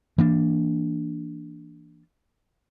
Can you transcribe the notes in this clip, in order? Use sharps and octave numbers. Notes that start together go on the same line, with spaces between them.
E3 A#3 D4